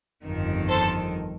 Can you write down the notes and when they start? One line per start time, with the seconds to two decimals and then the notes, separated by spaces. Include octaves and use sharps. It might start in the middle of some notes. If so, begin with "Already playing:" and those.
0.25 G1 F2 D#3
0.69 A4 C5